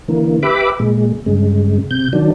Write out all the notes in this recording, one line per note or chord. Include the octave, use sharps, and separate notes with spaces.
D3 E3 A#3
G4 B4 E5 B5 D6
A#2 G#3
G2 C#3 G#3
C3 G6
D#3 F#3 D4